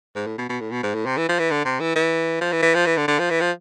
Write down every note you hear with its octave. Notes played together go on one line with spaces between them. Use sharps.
G#2
A2
B2
B2
A2
B2
G#2
A2
C3
E3
F3
E3
D3
C3
E3
E3
F3
E3
E3
F3
E3
D3
D3
F3
E3
F3